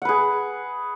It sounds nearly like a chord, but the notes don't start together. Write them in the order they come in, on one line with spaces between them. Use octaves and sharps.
F#5 B4 G#4